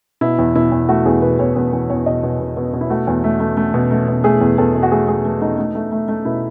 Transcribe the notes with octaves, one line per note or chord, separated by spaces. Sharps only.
B2 E4
E2
B2 E4
E2
A3 F#4
E2 G#4
B2 B4
E2 C#5
E2 B4
E2 B4
E2 C#5
B2 D#5
B2
B2
B2
B2
E4
A3 F#4
E2
A3
A3
A3
B2
A3
B2
A3 G#4
E2
E2 A4
B2
F#4
A3 G#4
A3 G#4
A3
A3 D#4
A3
A3
A3
A3
B2 E4